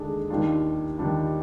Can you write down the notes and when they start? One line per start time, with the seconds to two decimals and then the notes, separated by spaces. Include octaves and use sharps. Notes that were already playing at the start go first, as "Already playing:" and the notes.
Already playing: D#2 D3 G#3 D4 G#4
0.30 D#2 D#3 G3 D4 F4
0.97 D#2 D#3 G3 D4 F4